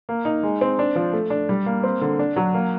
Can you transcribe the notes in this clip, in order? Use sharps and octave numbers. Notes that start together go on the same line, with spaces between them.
A#3
D#4
G#3
C4
D4
F3
A3
D4
G3
A#3
C4
D3
D4
F#3
A#3